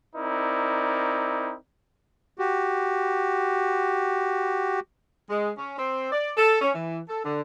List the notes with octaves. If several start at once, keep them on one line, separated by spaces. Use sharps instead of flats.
C4 D#4 E4 A#4 D5
F#4 G4
G#3
C#4
C4
D5
A4
C#4
E3
A4
D3